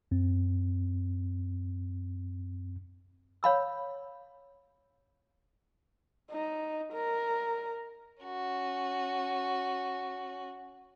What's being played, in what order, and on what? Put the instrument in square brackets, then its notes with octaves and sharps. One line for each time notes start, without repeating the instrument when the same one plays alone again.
[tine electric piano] F#2 C4
[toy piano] C#5 F5 B5 E6
[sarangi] D#4
A#4
[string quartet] C#4 F#4